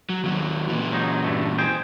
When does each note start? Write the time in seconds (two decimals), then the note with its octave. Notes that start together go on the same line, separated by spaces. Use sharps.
0.09 F#3
0.24 D#2 F#3
0.68 A#2 E3
0.93 F#3 D#4
1.24 G2 A3
1.58 G#4 C5 G5